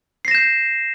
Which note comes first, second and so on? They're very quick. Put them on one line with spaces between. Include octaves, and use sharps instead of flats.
C7 A#6 E7 G6